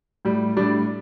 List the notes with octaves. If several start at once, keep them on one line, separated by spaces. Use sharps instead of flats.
A2 G3
A2 G3 D4